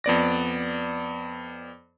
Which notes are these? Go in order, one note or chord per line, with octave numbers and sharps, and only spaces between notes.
F2 B3 D5 A#6